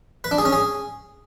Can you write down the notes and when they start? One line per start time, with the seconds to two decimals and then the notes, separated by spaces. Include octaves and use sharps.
0.24 B4
0.31 D4
0.38 G#4
0.45 C#4
0.52 G#4